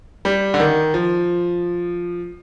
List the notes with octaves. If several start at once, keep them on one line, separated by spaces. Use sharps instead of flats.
G3
D3
D#3
F3